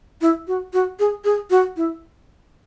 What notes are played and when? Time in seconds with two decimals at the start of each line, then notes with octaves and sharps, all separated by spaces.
0.21 E4
0.47 F#4
0.73 F#4
0.99 G#4
1.24 G#4
1.50 F#4
1.76 E4